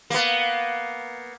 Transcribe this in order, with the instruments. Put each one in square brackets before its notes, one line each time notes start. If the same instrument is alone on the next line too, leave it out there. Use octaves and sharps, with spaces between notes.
[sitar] A#3 B3